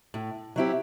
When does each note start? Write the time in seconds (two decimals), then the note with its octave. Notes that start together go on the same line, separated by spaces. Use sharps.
0.14 A2
0.56 F#3 C4 E4 G4